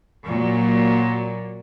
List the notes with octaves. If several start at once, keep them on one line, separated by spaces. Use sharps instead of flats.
A#2 F#3